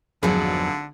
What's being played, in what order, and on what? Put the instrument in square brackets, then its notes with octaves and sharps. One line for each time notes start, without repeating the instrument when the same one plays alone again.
[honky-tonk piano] G#1 G#4 [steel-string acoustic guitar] F2 F#3 B3 [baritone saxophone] D3